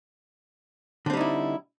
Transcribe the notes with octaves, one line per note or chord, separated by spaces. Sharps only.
D3 G3 C4 D#4 E4